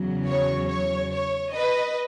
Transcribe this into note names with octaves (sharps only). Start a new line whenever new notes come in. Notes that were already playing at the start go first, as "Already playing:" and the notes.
Already playing: E2 C#3 F#3
C#5
C#5
C#5
B4 D#5